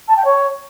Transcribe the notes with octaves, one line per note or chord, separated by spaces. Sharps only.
A5
G5
C#5